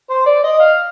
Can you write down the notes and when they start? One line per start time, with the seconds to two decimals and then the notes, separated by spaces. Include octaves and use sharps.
0.10 C5
0.26 D5
0.44 D#5
0.60 F5